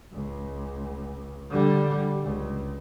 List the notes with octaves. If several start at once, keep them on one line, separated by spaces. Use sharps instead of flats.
C#2
D3 G3
C#2